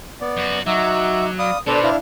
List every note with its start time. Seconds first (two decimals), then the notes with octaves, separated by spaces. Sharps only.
0.21 B3 D5
0.37 F#2 F#4
0.66 F#3 D#4 F#4 E5 D6
1.39 D5 F5 B5 D#6
1.67 B2 D4 A4 B4 C5 D5
1.84 D4 E4 F5